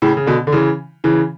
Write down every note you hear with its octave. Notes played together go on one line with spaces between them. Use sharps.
A2 C#3
C#3
B2 D3
D3
C#3 E3
C#3 E3